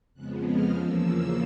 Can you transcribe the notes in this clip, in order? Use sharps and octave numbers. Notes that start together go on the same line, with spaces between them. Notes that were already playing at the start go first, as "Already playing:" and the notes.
F2 C#3 F3 G#3 B3 F#6
F6
E2 C#3 F3 A#3 E6